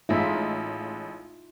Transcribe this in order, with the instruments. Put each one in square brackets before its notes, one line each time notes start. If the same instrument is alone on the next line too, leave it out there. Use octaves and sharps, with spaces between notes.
[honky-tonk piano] A1 G#3 [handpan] D#4 F4 E5